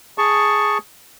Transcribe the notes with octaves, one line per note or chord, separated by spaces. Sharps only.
G#4 A5 C#6